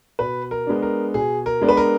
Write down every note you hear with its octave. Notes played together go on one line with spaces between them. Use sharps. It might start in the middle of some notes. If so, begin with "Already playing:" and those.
B2 B4
A#4
G#3 B3 D4
A#4
B2 G#4
A#4
G#3 B3 D4
B4
A#4